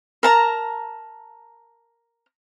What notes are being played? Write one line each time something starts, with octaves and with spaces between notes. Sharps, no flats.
A#4 A5 A#5